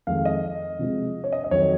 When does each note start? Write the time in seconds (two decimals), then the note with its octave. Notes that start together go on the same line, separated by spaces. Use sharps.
0.07 F2 D#3 G#3 F5
0.25 D#5
0.79 C3 F3 G#3
1.24 C#5
1.32 D#5
1.44 D#5
1.51 F2 D#3 F#3 C#5